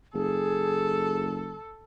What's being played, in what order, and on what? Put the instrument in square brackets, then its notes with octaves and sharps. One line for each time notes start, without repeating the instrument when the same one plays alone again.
[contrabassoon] F#1 [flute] G#4 [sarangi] A4